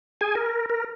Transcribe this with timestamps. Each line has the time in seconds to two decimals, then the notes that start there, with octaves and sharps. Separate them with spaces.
0.21 G#4 G#5
0.36 A#4
0.70 A#4